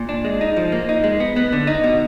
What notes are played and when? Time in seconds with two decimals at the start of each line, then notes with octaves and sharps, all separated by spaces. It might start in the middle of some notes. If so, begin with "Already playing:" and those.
Already playing: A#2
0.09 D4
0.24 G#3
0.41 D#4
0.57 F3
0.72 A#3
0.89 D#4
1.04 G#3
1.20 B3
1.36 B3
1.52 D3
1.67 D#4
1.84 B2